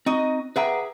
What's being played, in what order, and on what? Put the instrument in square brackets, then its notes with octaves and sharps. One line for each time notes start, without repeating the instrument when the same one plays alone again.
[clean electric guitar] C4 [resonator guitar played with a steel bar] D#4 F#4 D#5
[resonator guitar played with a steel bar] G#4 E5 G5 [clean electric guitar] B4 F#5 A#5